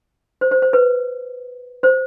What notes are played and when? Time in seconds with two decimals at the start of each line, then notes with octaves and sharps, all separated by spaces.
0.41 C5
0.51 C5
0.62 C5
0.73 B4
1.83 C5